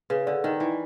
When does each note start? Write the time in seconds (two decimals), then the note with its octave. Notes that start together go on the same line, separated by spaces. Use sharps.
0.10 C#3 B4
0.26 D3 D5
0.44 D#3 D#4
0.60 E3 D#4